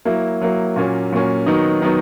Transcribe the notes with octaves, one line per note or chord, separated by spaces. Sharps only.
F#3 A#3 E4
F#3 A#3 E4
A#2 F#3 A#3 C#4
A#2 F#3 A#3 C#4
D#3 F#3 B3 D#4
D#3 F#3 B3 D#4